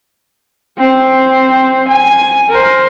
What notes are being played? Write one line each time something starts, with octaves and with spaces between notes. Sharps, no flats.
C4 C5
G#5
A#4 C5